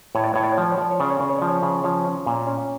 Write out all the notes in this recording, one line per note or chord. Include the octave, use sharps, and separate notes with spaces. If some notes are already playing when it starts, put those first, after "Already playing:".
A2 C#5
D5
A2 C#5
D5
C#5
F3 D5
C#5
F3 D5
C#5
C#3 D5
C#5
C#3 D5
C#5
F3 D5
C#5
C#3
F3 C#5
C#4
A#2
C#4